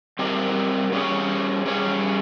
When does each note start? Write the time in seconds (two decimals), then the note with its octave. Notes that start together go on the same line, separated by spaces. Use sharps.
0.19 G3 C4 G4 A#4 D#5
0.92 G3 C#4 G#4 C#5
1.66 G3 C#4 G#4 C#5